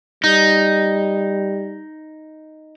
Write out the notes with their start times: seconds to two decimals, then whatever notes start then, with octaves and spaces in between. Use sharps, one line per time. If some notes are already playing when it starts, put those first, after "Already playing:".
0.24 G3 D#4